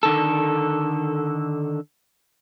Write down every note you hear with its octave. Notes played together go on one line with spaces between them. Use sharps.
D3 D#3 A4